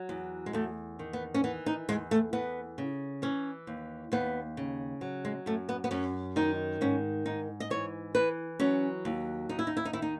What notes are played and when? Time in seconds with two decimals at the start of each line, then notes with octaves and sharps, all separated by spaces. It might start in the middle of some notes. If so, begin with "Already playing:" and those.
Already playing: F#3
0.09 E2
0.46 G#3
0.53 E2 A3
0.99 D#3
1.13 B3
1.34 C#4
1.44 E3 B3
1.66 D#4
1.89 E2 G#3
2.11 A3
2.33 E2 B3
2.78 C#3
3.22 E3 C#4
3.67 D#2
4.12 D#2 B3
4.57 C#3
5.01 F#3
5.25 G#3
5.46 F#2 A3
5.69 B3
5.84 B3
5.91 F#2 C#4
6.36 D#3 D#4
6.81 G#2 C#4
7.26 G#2 D#4
7.60 D#5
7.70 E3 C#5
8.15 E3 B4
8.60 F#3 C#4
9.05 D#2
9.49 D#2 D#4
9.59 E4
9.67 D#4
9.77 E4
9.85 D#4
9.93 D#3 E4
10.02 D#4